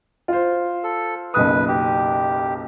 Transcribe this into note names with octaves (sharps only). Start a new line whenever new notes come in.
F4 C5
A4
F#1 B1 B4 D#6
G4